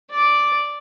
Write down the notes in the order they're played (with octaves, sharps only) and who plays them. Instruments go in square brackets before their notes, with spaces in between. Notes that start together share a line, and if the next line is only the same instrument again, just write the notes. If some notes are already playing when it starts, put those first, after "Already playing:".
[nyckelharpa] D5 D6